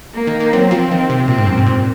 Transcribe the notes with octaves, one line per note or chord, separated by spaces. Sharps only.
A#3
D#3
D#3
F#3 C4
F3
D#3
C3
A#2 C4
G#2
F#2
G#2
A#2